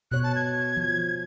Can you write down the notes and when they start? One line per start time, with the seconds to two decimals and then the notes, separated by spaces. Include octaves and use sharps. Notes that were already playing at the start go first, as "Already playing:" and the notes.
0.11 B2 C#5 F#6
0.24 A5
0.36 G#6
0.77 F3